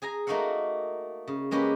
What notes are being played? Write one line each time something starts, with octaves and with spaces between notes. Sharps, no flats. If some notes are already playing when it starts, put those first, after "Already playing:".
G#4 G#5 A#5
A3 A#3 D#4 F#4 F5 F#5
C#3
G#3 A#3 C#4 G4 B4